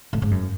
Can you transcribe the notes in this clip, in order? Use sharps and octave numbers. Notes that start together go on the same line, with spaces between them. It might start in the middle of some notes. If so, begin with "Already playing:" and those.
A2
G#2
F#2